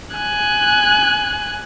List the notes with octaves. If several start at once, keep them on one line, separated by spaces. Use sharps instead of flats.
G#5 F#6